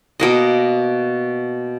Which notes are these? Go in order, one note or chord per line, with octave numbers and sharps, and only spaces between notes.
B2 A#3 D#5